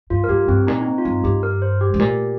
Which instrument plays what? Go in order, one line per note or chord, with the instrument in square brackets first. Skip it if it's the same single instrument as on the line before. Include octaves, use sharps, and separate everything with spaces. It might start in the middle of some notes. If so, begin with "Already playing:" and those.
[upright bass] G2 [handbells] F4
[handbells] A#4
[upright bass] G2 [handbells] G4
[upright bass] G2 [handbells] C4
[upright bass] A#2 [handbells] D#4
[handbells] D#4
C4
F4
[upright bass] G2 [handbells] D#4
[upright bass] G2 [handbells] G4
[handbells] A#4
C5
G4
[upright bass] G2
[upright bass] A#2 [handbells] G4